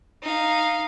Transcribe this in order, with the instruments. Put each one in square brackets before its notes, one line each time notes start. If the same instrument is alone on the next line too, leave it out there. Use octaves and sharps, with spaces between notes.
[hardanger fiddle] D#4 F5